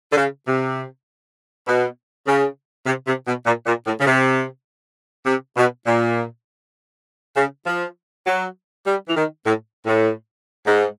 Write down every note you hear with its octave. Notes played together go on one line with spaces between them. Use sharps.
D3
C#3
C3
B2
C#3
C3
C3
B2
A#2
A#2
A2
C#3
C3
C3
B2
A#2
C#3
F3
F#3
G3
E3
D#3
A2
A2
G#2